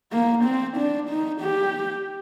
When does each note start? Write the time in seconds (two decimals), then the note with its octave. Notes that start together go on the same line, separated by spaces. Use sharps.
0.12 A#3
0.44 C4
0.77 D4
1.10 D#4
1.41 G4